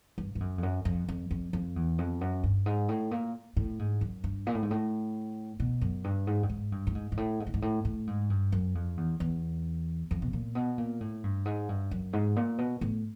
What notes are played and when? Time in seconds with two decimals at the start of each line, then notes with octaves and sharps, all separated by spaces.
0.18 G2
0.35 G2
0.40 F#2
0.58 F2
0.63 F#2
0.85 F2
1.08 F2
1.31 F2
1.53 F2
1.76 E2
1.98 F2
2.21 F#2
2.44 G2
2.66 G#2
2.89 A2
3.11 A#2
3.57 A2
3.79 G#2
4.01 F#2
4.24 G2
4.47 A#2
4.55 A2
4.62 G#2
4.71 A2
5.60 B2
5.81 F#2
6.04 G2
6.27 G#2
6.43 G2
6.49 G#2
6.72 G2
6.87 A2
6.95 G#2
7.12 G#2
7.17 A2
7.40 G#2
7.47 A2
7.54 G#2
7.62 A2
7.85 A2
8.07 G#2
8.30 G2
8.52 F#2
8.75 F2
8.97 E2
9.20 E2
10.11 F2
10.22 B2
10.33 A#2
10.55 B2
10.78 A#2
11.00 A2
11.24 G2
11.45 G#2
11.69 G2
11.91 F#2
12.13 G#2
12.36 A#2
12.58 B2
12.81 A2